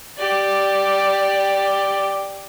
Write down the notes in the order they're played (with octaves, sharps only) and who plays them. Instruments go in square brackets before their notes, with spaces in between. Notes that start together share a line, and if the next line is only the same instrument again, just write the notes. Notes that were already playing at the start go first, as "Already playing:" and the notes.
[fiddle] G4 D5